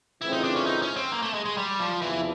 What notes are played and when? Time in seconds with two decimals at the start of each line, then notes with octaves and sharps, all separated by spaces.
0.22 C#3 E3 A3 C4 E4 F4
0.33 D#4
0.44 D4
0.56 C#4
0.66 D#4
0.82 C#4
0.96 C4
1.12 A#3
1.22 A3
1.34 G#3
1.45 G#3
1.57 G3
1.79 F3
2.02 E2 C3 E3 F3